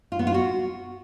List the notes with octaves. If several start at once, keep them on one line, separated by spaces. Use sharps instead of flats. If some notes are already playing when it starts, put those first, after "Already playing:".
F4
B3
F4
F#4